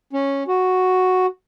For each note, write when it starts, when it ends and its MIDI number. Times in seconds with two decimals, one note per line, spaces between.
0.13 0.43 61
0.48 1.26 66